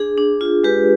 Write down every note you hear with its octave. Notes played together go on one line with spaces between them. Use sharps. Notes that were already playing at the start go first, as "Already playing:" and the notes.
Already playing: D4 G#4
D4
F4
G#3 G4 B4